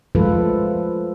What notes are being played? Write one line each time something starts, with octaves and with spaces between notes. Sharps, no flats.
F3 G#3 A3 F4 A4 B4